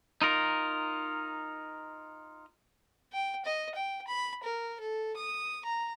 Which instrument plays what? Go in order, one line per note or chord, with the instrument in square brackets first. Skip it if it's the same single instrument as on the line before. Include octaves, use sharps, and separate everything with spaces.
[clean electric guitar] D#4 F4 A#4
[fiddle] G5
D#5
G5
B5
A#4
A4
D#6
A#5